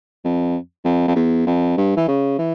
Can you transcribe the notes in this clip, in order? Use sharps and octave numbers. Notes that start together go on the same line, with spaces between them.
F2
F2
F2
E2
F2
G2
E3
C#3
E3